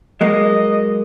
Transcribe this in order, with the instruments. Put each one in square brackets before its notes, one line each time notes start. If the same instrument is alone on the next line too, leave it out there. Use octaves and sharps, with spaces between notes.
[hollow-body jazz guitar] F#3 G#3 A#3 [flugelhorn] D#5